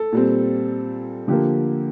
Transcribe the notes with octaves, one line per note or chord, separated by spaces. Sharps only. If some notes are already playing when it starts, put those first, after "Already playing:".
Already playing: A4
A#2 G3 C4
D3 F3 A#3 G4